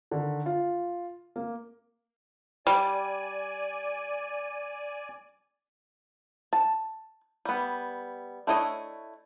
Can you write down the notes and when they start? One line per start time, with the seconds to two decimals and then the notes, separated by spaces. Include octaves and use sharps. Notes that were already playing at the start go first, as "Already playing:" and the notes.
0.11 D3 D#3
0.46 F4
1.36 A#3
2.67 G3 D5 G#5
6.53 A5
7.45 G3 B3
8.47 A3 D4 E4 C#5 D#5